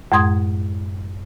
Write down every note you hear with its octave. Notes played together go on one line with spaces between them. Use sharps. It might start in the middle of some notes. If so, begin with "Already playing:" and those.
F#2 A2 G#3 C6 D#6 G#6